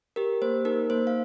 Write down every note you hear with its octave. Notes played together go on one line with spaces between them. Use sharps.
G4 A#4
A#3 C5
D#4 A#4
A#3 C5
F5